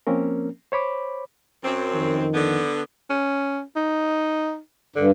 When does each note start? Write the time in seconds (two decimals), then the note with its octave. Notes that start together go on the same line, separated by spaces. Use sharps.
0.07 F3 A#3 C4 C#4 A#4
0.72 C5 C#5 B5 D6
1.63 F#2 C4
1.92 F2 D#3
2.34 D3 B3
3.10 C#4
3.76 D#4
4.96 G2 D3